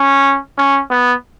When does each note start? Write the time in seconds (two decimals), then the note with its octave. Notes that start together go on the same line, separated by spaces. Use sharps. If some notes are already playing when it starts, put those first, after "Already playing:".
Already playing: C#4
0.58 C#4
0.90 B3